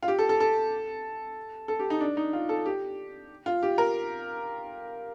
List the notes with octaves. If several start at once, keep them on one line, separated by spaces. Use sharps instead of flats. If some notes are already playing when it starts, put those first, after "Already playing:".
F4
G4
A4
A4
A4
A4
G4
D#4
D4
D#4
F4
A4
G4
F4
G4
A#4